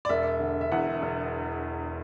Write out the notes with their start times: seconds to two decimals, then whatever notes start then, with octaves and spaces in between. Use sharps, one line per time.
0.05 D5
0.09 E1 E5
0.40 D3
0.61 E5
0.72 E2 F#5
1.02 E1